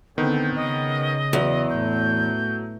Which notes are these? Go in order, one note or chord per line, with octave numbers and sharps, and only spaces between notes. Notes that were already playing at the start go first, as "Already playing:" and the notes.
D3 D#3 B3 C4 G6
C#3 D#5
E2 F#3
A2 A3 G6